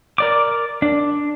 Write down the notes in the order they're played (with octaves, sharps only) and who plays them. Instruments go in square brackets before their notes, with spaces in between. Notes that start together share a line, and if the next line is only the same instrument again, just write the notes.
[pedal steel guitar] A#4 D5 D6
D4